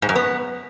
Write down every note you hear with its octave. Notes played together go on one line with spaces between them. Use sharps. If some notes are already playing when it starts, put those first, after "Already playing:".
G#2
F#2
B3